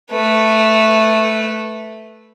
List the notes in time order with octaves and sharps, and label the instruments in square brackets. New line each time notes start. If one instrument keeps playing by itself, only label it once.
[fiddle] A3 B4